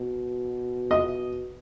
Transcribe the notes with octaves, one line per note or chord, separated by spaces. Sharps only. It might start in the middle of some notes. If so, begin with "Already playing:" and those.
Already playing: B2
D#5